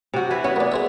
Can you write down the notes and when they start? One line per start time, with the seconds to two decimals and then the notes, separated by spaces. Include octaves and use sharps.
0.14 C3 F#4
0.30 E3 E4 B4
0.44 B3 C#4
0.56 A#3 D5
0.72 G#4 C5 E5